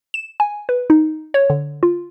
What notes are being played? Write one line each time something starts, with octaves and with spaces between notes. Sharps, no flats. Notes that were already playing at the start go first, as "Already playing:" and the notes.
E7
G#5
B4
D#4
C#5
D3
F4